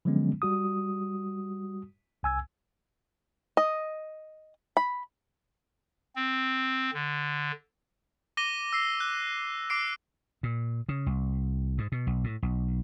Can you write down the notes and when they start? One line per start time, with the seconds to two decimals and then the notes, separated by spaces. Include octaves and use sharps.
0.05 D3 F3 F#3 G#3 B3 C#4
0.42 G3 F#4 D#6
2.23 C2 G#5 E6 G#6
3.57 D#5
4.77 B5
6.16 C4
6.94 D3
8.37 D6 A#6 D#7 G7
8.73 E6 C7
9.00 F#6
9.70 D6 E6 C7 D7
10.43 A#2
10.89 C#3
11.06 C2
11.78 G#2
11.92 B2
12.07 B1
12.24 A2
12.43 B1